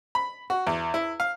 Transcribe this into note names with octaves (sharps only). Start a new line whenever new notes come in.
B5
F#4
E2
E4
F5